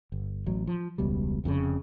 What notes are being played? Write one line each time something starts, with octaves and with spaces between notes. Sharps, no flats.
G1
A1 F#3
F3
E1 C#2 B2 G3
F1 F2 A2 C#3